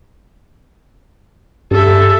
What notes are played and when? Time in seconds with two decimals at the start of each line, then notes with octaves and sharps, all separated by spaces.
1.71 G2 G4 A4 E5 E6